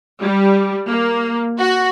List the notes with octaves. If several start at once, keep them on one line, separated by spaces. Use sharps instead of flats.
G3
A#3
F#4